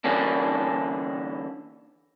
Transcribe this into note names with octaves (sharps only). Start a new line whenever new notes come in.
D3 E3 G3 A#3 C#4 D4